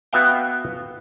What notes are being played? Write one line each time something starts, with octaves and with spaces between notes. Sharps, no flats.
B3 F#4 B4 E5 F5 G5